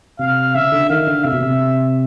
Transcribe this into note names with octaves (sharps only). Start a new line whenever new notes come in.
C3 F5
C#3 E5
D3
D#3 F5
D3
C3 E5
B2
C3